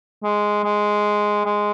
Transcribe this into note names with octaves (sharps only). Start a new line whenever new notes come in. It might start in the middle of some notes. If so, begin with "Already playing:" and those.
G#3
G#3
G#3